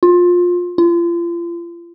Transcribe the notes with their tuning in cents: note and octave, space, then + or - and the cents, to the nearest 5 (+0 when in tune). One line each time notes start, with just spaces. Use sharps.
F4 +20
F4 -35